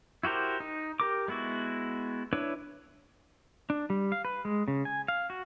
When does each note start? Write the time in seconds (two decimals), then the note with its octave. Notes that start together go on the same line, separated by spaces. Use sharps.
0.23 E4 F#4 G4 A#4 C5
0.60 D#4
1.00 G4 A#4 D6
1.28 G#3 B3 E4 F#4
2.33 D4 E4 B4 C#5
3.70 D4
3.90 G3
4.12 F5
4.25 B4
4.45 G#3
4.68 C#3
4.85 G#5
5.08 F5
5.30 F#4